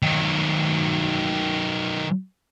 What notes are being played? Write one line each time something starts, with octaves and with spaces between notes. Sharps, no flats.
D#3 F#3